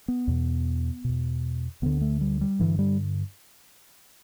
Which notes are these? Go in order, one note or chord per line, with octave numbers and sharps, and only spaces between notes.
B3
E2 B2
E2 B2
D2 D3 B3
A3
G3
G3
G2 D3 E3
G3